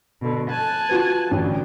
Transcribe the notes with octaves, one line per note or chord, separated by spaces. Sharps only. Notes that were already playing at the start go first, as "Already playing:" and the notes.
B2 D3
G#5 A5 F#6
F4 F#4 B4
A1 D3 F#3